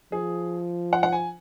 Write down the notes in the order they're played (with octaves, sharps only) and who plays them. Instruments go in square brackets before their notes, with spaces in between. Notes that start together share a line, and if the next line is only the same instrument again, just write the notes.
[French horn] F3 [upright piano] G#4
[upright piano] F#5
F#5
G#5